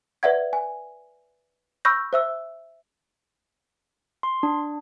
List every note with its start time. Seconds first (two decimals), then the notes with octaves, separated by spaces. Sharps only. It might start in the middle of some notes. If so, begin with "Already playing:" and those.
0.23 B4 D5 E5 F#5 G#6
0.53 G#5
1.85 B5 C#6 E6 F6 G6 A#6
2.13 C5 E5 E6
4.23 C6
4.43 D4